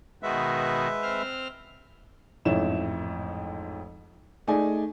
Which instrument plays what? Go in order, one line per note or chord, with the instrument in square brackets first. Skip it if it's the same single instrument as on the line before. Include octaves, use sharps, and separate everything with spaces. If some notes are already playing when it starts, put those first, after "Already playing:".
[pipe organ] B2 D#3 F#4 [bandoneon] G#3 B4 E5
[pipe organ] C4 C5 F6
[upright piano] A1 F2 G#2 E4 C#5 E7
A3 D#4 G#4 D5 G#5